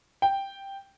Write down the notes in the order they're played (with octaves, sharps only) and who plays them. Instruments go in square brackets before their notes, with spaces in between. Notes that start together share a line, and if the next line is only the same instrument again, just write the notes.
[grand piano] G5